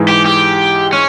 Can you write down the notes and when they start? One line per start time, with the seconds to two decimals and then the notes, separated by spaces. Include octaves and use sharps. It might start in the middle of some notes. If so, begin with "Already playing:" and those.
Already playing: G#2 E3 G#3
0.08 G4
0.25 G4
0.93 C#4